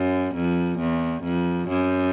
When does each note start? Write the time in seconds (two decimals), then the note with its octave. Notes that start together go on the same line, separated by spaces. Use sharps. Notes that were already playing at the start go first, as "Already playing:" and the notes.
Already playing: F#2
0.35 F2
0.79 E2
1.23 F2
1.69 F#2